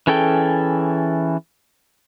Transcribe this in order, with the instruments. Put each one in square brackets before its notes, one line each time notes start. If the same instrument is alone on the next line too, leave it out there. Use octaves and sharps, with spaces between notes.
[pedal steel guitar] E3 C#4 G#4 A4 G5